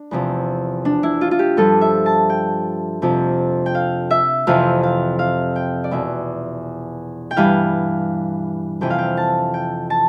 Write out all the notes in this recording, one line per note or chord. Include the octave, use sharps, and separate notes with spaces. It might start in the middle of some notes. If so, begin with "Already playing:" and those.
Already playing: D4
E2 C3 F3
D4
E4
F4
F4
G4
G2 F3 A4
E5
A5
G5
F2 C3 F3
G5
F5
E5
F2 C3 E3 F5
F5
F5
G5
D5
E2 B2 E5
G5
G2 E3 F5
F2 C3 E3 G5
F5
G5
A5
G5
A5